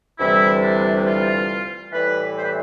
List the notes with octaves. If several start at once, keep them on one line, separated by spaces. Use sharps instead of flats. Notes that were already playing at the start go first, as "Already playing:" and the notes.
D2 C3 E3 G3 E4
D4
F4
A2 E3 G3 B4
C5
B4